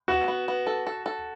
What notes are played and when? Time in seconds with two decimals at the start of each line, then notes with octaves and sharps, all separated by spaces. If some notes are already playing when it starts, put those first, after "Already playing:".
0.08 B3 F#4
0.28 B3
0.48 B3
0.67 A4
0.87 A4
1.06 A4